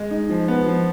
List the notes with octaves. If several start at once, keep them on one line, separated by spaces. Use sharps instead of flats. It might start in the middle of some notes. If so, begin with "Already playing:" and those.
Already playing: G#3
D#4
F3
B3
F3